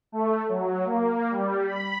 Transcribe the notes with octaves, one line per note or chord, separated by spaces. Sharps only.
A3
F#3
A#3
G3
B5